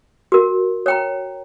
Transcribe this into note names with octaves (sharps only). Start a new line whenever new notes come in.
F#4 A#4
C#5 G5 A#5